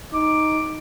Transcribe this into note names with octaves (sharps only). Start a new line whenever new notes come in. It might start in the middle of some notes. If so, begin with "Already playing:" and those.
D#4 D6